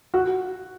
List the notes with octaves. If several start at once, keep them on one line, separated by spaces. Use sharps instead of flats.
F#4